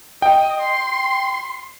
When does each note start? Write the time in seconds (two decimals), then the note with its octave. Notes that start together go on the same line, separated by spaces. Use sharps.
0.22 D#5 G5
0.61 C6